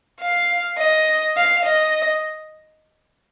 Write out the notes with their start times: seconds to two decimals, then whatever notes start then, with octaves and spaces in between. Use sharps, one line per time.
0.21 F5
0.78 D#5
1.37 F5
1.66 D#5